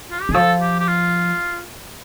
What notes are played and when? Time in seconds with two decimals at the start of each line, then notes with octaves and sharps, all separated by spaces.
0.11 F4
0.22 G4
0.29 D#3
0.34 F3 A4
0.61 G4
0.80 G4
0.88 F4